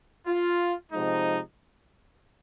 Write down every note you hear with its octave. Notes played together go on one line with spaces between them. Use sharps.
F4
C3 F3 G#3 D#4